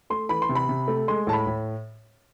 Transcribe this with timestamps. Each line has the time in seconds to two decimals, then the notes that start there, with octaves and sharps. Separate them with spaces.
0.10 A3 C6
0.29 E3 B5
0.42 C6
0.49 C3
0.55 B5
0.69 C3
0.88 A3
1.08 G#3 C6
1.27 A2 A5
1.33 B5
1.47 A2